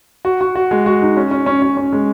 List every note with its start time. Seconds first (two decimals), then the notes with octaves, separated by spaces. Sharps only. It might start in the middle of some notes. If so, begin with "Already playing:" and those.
0.25 F#4
0.41 F#4
0.55 F#4
0.71 G#3
0.86 F#4
1.02 D#4
1.17 C#4
1.31 C#4
1.46 C#4
1.62 C#4
1.77 C#4
1.93 G#3